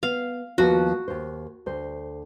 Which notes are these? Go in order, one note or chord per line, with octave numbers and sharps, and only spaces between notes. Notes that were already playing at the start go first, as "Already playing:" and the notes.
B3 F5
D#2 F3 B3 F#4
D#2 C5
D2 C5